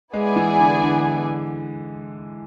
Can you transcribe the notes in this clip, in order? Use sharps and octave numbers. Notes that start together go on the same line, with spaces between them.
G#3 B3 E4 G#4 D5 G#5
E3
D3
D3